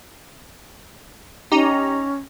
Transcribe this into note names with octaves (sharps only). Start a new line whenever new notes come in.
C#4 D#4 G4 A#5